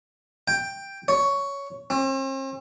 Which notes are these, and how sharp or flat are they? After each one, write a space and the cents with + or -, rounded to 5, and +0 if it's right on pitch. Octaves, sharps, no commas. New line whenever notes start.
G5 +5
C#5 +10
C4 +45